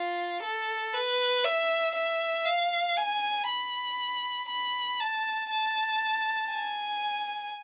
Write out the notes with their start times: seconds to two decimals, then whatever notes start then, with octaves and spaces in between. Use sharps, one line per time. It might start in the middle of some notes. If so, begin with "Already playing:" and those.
Already playing: F4
0.43 A4
0.94 B4
1.45 E5
1.95 E5
2.46 F5
2.97 G#5
3.48 B5
4.49 B5
5.00 A5
5.51 A5
6.52 G#5